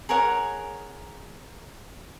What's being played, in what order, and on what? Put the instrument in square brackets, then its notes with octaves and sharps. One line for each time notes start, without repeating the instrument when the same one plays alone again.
[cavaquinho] G#4 A#4 C#5 F#5